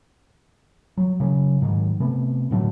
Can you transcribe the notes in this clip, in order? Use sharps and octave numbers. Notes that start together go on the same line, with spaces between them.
F#3
C#3 F#3
G#2 D#3 F#3
C3 A3 B3
A2 D3 F#3 A3